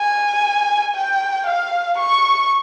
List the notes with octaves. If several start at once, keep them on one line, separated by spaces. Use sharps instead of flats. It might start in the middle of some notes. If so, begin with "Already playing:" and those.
Already playing: G#5
G5
F5
C#6